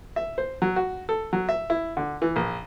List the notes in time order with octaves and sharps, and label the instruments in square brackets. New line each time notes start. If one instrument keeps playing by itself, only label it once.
[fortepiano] E5
C5
F#3
F#4
A4
F#3
E5
E4
D3
E3
A#1